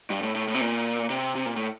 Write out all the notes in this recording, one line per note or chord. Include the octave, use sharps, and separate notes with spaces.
G2
A2
A2
A2
C3
A#2
C3
C3
A#2
A2